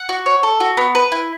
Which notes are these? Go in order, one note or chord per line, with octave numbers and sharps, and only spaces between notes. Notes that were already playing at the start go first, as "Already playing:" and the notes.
Already playing: F#5
F#4
C#5
A4
F#4
B3
B4
E4